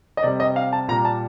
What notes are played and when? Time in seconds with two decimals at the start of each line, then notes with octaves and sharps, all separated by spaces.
0.17 D#5
0.23 C3 G3 D5
0.40 D#5
0.56 F5
0.73 A5
0.88 A#2 A#5
0.92 G3
1.05 A5